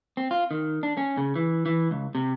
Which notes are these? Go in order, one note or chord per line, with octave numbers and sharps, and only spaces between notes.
C4
F4
D#3
D4
C#4
C#3
E3
E3
C#2
C3